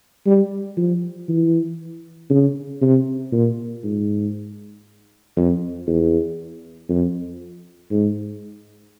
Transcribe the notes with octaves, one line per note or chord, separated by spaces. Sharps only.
G3
F3
E3
C#3
C3
A#2
G#2
F2
E2
F2
G#2